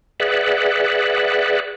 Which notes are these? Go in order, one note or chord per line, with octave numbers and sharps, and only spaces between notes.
G#4 B4 D5 E5 F#5